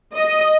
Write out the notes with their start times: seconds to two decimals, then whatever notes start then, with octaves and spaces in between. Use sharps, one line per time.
0.14 D#5